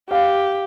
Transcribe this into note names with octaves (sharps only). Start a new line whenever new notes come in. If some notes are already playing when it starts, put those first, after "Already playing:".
G4 F5